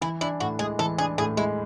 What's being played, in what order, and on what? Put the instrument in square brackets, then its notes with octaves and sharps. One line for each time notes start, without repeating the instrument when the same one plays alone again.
[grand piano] E3 [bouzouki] E4
[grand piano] D4 [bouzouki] E4
[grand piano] A2 [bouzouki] F#4
[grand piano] G#3 [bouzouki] G#4
[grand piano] E3 [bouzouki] A4
[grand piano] D4 [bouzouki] G#4
[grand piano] A2 [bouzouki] G#4
[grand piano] G#3 [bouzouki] E4